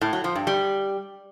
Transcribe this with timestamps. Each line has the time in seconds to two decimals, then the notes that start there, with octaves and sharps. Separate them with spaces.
0.01 A2
0.13 F#3
0.24 F3
0.36 G2
0.47 G3